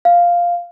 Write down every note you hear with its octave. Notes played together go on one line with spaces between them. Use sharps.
F5